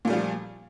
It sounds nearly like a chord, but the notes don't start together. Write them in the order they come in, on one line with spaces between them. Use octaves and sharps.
A#2 A3 G3 F3